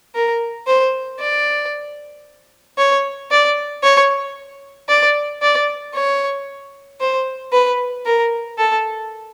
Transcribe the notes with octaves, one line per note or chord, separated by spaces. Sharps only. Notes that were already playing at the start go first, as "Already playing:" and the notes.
A#4
C5
D5
C#5
D5
C#5
D5
D5
C#5
C5
B4
A#4
A4